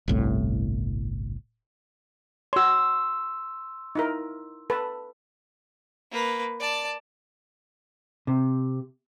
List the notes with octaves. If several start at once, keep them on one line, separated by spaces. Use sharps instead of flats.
G1 C2 A2
F#4 C#5 C6 E6
D#4 E4 A#4
A4 B4 A5
A#3 B4
D5 A5
C3